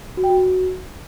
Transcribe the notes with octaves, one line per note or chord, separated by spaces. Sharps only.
F#4
G5
F#4